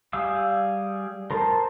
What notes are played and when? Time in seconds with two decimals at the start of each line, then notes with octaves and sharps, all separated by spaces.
0.13 G3 G#4 F5 E6
1.31 A#4 C5 A5